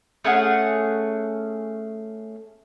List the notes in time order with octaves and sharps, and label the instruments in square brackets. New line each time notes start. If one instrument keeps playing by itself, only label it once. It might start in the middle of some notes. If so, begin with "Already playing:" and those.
[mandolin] A3 C#4 G#4 F#5